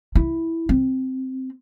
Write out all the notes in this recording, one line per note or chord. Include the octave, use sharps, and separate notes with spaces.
E4
C4